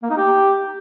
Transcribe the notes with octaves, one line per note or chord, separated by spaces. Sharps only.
A#3
D#4
G4